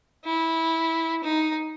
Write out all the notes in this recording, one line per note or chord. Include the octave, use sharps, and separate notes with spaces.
E4
D#4